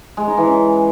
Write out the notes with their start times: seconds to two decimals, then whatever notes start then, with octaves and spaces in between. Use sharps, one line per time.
0.17 G#3
0.27 D#4
0.37 E3
0.48 C#4